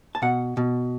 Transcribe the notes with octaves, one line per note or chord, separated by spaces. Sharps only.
A5
B2 F#5
B2